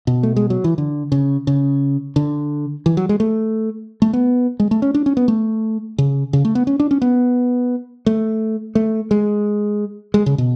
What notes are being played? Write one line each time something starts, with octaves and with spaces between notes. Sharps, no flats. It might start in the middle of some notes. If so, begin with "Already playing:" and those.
B2
A3
G#3
F#3
E3
D3
C#3
C#3
D3
E3
F#3
G#3
A3
A3
B3
G#3
A3
C#4
D4
C#4
B3
A3
C#3
C#3
A3
B3
C#4
D4
C#4
B3
A3
A3
G#3
G#3
C#3
B2